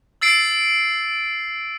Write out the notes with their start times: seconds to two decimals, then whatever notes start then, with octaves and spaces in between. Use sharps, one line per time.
0.22 E6 A6 C7 D7